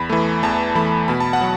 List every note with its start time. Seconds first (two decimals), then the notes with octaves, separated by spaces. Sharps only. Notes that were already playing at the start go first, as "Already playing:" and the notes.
Already playing: E2 B5
0.10 E3 A3
0.43 E2 A5
0.75 E3 A3 B5
1.08 B2 B5
1.20 A5
1.33 F#5
1.41 F#3